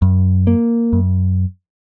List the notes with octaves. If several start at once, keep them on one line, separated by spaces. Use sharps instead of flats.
F#2
A#3
F#2